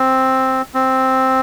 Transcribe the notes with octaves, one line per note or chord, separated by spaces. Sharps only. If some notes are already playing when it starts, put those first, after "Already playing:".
Already playing: C4
C4